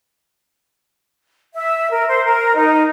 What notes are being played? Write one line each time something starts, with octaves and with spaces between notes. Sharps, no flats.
E5
A#4
C5
A#4
D#4